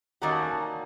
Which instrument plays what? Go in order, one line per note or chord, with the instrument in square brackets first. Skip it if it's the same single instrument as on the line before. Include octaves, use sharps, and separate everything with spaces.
[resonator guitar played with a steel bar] D#3 G3 A#3 C#4 F#4 [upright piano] A#5
[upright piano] A5
G#5
A5